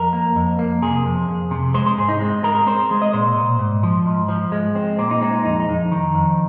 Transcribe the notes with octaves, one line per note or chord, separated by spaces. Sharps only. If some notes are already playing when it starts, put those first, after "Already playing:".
Already playing: F2 A#4
A#3
F2
A#3
C3 G#4
F2
F2
C3
G#3 C5
C5
G#2 G#4
D#4
G#3 C4
G#3 A#4
A#4
C4 C5
G#3
D#5
A#2 C5
A#2
G#2
F3
G#2
F3
G#3
C4
A#2 C4
D#4
G#3 C4
D#4
F2 D#4
D#4
F2
D#3
F2